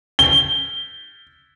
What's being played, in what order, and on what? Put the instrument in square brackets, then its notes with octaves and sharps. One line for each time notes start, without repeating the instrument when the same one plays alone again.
[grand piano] G7